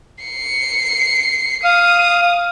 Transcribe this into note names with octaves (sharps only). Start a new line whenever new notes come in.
C7 C#7
F5 D#6